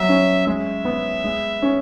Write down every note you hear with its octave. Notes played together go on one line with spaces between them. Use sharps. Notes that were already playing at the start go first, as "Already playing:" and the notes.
Already playing: F#3 B3 E5
C#4
G#3 E5
B3
G#3
C#4